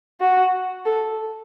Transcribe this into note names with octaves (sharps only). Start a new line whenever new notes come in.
F#4
A4